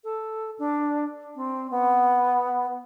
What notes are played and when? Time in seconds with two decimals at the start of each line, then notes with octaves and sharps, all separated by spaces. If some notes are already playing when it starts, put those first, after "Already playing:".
0.04 A4
0.59 D4
1.36 C4
1.71 B3